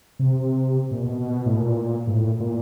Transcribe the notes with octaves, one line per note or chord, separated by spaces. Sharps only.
C3
A#2
B2
A2
A#2
G#2
A2
A#2